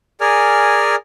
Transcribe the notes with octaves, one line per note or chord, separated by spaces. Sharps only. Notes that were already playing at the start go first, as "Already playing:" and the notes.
G#4 A#4 D5 G#5 F6